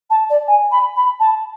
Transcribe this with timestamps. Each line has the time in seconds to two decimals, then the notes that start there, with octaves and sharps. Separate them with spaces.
0.10 A5
0.29 D5
0.47 G#5
0.71 B5
0.96 B5
1.19 A5